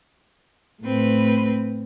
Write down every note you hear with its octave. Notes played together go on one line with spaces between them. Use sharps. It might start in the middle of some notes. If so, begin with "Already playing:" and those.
A2 C4 B4